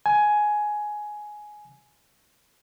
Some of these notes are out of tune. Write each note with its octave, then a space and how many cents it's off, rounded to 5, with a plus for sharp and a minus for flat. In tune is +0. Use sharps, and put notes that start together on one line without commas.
G#5 +10